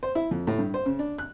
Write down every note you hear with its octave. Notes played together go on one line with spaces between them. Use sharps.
C5
E4
F2
A2
G2
C5
C#3
D4
F#6